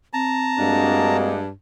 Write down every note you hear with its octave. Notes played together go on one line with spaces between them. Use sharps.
C4 A5 A#5
G2 G#3 A#3 D4 F#4